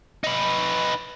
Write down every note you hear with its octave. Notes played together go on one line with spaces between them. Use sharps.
D#4 B4